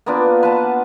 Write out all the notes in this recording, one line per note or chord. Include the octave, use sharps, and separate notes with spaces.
A#3 B3 D4 F4
B4 F#5 A5